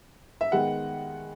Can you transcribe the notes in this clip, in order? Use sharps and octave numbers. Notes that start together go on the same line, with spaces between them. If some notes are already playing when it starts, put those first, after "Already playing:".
E5
D#3 G#3 B3 F#5